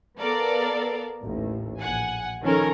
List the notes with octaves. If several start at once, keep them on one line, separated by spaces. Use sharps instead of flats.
B3 A4 A#4 D5 F5
A1 D#2
A#1 F#5 G#5
D#3 F3 C#4 A4 A#4